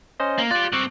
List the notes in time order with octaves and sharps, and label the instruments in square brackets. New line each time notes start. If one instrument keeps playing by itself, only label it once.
[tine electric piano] C#4 C5 D#5
[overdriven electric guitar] A#3
[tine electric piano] F4 F#6 [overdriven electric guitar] G4 D5
[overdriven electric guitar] G2 C4 [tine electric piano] C#6 D6 F#6